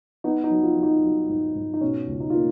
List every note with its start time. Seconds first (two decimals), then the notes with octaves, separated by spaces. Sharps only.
0.24 B3 D#4
0.44 D#4
0.50 F#3
0.63 F4
0.77 F#3
0.83 D#4
1.03 F#3
1.29 G#2
1.55 G#2
1.74 D#4
1.81 B2 C#4
2.07 C#2
2.20 D#4
2.30 A#3 F4